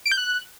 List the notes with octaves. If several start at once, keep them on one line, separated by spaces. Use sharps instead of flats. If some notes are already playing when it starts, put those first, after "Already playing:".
D7
G6
F#6